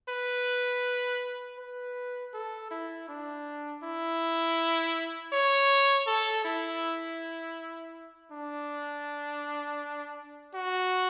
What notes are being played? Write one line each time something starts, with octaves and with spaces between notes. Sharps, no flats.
B4
B4
A4
E4
D4
E4
C#5
A4
E4
D4
F#4